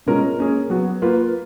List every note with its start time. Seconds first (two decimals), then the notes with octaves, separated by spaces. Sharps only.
0.06 B2 G#3 C#4 F4 A#4
0.39 A#3 C#4 G#4
0.70 F#3 B3 F#4
1.02 A#3 F4 B4